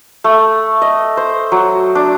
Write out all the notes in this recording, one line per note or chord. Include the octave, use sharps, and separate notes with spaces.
A3
D#5
C5
F#3
D4